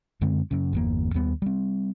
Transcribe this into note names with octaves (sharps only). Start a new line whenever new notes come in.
F#2 D3 G#3 C4
F#2 C#3
G1 E2 A#3
D#2 G3 B3
G3 C4